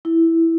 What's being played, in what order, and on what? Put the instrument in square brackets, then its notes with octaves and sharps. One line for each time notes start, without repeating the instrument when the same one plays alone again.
[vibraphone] E4